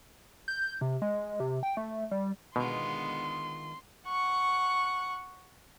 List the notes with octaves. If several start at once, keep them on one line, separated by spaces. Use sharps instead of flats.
G6
C3
G#3
C3
G5
A3
G3
B2 D3 D#3 G#3 B3 F4 C6
F#5 C#6